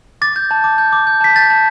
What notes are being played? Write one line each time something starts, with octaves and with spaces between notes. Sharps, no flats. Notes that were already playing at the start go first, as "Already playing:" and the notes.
D6 A6
G6
A5
D6
G6
D6
G6
A5 B6
G6 A6
A5